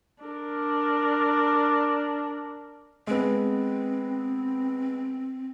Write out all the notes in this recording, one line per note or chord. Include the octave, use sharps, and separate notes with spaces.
D4 A#4
G#3 B3 C4